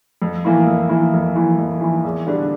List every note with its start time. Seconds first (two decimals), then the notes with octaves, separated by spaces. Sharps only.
0.22 F2
0.45 E3 A#3 E4
0.67 F2
0.89 E3 A#3 E4
1.13 F2
1.36 E3 A#3 E4
1.58 F2
1.81 E3 A#3 E4
2.04 E2
2.27 D3 G3 D4